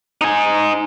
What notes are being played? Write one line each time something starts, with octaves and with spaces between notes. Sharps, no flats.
D#4 G#5